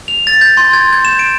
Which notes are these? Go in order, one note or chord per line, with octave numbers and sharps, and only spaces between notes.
F7
A6
G6
C6
G#6
G6
E7
D7